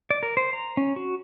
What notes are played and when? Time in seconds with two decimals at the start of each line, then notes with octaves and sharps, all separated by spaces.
0.10 D5
0.23 A#4
0.37 C5
0.53 A#5
0.77 C#4
0.96 F#4